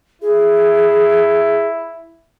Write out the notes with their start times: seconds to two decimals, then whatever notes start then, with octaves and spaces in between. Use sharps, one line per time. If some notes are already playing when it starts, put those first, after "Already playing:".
0.22 E4 G#4